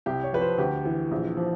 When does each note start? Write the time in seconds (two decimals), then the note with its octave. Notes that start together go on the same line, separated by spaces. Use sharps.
0.06 C2 G4
0.23 C#5
0.33 F3 B4
0.41 C5
0.58 D2 G4
0.85 E3
1.11 A#1
1.37 F3